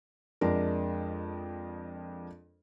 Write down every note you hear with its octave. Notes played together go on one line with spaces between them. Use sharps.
F2 G#3 D4 A#4